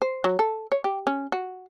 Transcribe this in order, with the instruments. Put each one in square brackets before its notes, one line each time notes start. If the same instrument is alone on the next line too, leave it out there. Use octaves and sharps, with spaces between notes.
[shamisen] C5
F#3
A4
C#5
G4
C#4
F#4